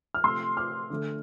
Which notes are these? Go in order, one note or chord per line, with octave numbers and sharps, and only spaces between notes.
F6
C3 F3 A3 C6 E6
D6 F6
D3 A3